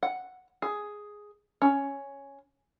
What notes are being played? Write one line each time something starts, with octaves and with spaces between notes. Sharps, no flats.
F#5
G#4
C#4